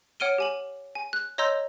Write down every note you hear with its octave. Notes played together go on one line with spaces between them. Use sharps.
C#5 F#5 F6 D7 D#7 G7
G4 G#5 F#7
G#5
F#6
C#5 D#5 A#5 C6 E6 G6